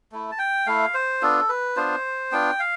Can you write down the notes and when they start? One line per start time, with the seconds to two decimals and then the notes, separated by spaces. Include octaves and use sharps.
0.12 A3 E4
0.31 A5
0.39 G5
0.66 A3 E4 F5
0.94 C5
1.22 B3 D4 F4 A4
1.49 B4
1.76 B3 D4 F4 C5
2.32 B3 D4 F4 G5
2.60 F5